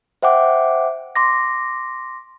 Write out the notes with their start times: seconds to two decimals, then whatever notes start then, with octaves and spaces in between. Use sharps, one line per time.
0.23 C5 E5 F#5 G5 D6
1.16 C6 D6 A#6